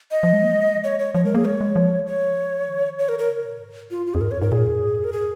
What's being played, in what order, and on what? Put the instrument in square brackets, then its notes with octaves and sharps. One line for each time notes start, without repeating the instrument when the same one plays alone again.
[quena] D#5
[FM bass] F3
G#3
A#3
G#3
[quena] C#5
C#5
[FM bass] F3 [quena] C#5
[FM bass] G#3 [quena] A#4
[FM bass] A#3 [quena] G#4
[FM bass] G#3 [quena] C#5
[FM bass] G#3
F3
[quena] C#5
[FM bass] D#3
[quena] C#5
A#4
A#4
[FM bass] C#3
A#2
G#2
[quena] F4
F4
[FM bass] F2 [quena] G#4
[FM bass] G#2 [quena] A#4
[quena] C#5
[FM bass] G#2 [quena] A#4
[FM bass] A#2 [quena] G#4
[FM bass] F2
G#2
[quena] A#4
G#4